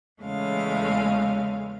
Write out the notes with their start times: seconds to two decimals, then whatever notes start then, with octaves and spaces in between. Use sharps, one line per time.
0.21 E2 C#3 G#3 A3 C#4 F5